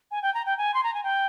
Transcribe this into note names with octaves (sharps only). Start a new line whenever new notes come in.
G#5
G5
A#5
G5
G#5
C6
A#5
G#5
G5